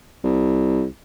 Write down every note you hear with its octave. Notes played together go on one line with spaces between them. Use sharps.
C2